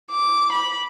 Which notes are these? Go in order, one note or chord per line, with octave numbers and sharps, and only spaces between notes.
D6
B5